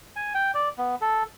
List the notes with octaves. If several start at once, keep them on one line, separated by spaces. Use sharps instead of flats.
G#5
G5
D5
B3
A4